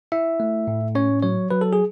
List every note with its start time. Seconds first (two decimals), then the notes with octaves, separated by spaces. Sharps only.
0.12 E4 E5
0.40 A3
0.67 A2
0.95 C#4 C#5
1.22 F#3 C#5
1.51 F#3 B4
1.61 A4
1.73 G#4